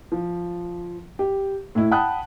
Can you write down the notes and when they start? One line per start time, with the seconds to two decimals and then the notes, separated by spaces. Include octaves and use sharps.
0.12 F3
1.19 G4
1.75 A2 E4
1.91 F#5 G5 A5 B5 D#6 F#6